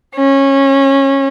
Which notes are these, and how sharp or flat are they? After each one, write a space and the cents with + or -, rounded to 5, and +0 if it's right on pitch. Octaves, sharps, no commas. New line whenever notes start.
C#4 -20